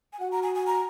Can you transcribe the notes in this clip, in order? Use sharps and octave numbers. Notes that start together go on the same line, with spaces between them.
G#5
F#4 F#5
A#5
G#5
G#5
A#5